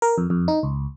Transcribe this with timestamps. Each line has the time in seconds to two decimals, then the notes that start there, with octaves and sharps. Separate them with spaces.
0.02 A#4
0.18 F2
0.30 F2
0.48 D#4
0.63 C#2